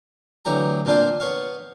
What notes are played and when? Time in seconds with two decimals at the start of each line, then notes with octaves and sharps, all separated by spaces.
0.45 D2 E3 F#3 G4 A#5
0.85 A#2 A#3 C4 D4 F4 C5
1.20 B3 C#5 F5